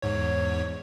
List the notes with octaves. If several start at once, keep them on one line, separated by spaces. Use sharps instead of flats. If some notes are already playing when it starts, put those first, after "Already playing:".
E2 G#2 C#5